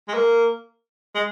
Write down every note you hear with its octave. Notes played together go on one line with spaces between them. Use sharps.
G#3
A#3
G#3